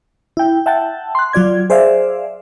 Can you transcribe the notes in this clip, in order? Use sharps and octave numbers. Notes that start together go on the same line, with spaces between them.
E4 G5
E5 F#5 G5 A5
C6 F#6
F#3 F4 D5 G#6
G#4 C5 D5 E5 F5